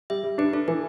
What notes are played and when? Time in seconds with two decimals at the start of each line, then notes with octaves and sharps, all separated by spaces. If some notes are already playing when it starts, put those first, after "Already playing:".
0.10 G3 E5
0.24 G3
0.38 D4 B4
0.53 D4 A4
0.68 E3 B4